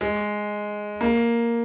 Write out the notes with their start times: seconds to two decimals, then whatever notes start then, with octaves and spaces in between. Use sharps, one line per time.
0.01 G#3
1.01 A#3